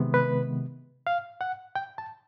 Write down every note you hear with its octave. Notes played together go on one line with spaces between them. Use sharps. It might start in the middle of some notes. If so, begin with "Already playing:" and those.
Already playing: C3 D#3 G#3 B3
B4
F5
F#5
G5
A5